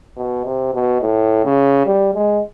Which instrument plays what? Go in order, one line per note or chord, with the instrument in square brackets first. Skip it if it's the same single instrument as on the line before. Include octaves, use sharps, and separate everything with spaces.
[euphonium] B2
C3
B2
A2
C#3
G3
G#3